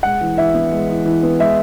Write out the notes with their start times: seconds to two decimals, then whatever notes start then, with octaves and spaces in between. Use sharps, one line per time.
0.03 G#3 F#5
0.21 E3
0.37 E3 E5
0.54 B3
0.72 G#3
0.89 E3
1.06 E3
1.23 B3
1.39 G#3 E5